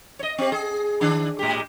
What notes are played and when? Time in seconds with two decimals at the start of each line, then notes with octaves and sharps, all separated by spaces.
0.19 C#5 D#5
0.38 C4 G4
0.52 G#4
1.01 D#3 D4
1.39 A2 G#3 G4